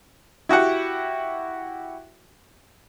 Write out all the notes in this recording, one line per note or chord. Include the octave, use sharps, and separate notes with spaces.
E4 F#4 G4 F#5